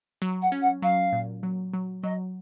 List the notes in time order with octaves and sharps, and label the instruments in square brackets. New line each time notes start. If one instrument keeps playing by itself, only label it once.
[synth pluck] F#3
[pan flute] F#5
[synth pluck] C#4
[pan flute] F#5
[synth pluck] F#3 [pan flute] F5
[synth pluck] A#2
F#3
F#3
[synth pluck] F#3 [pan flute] D#5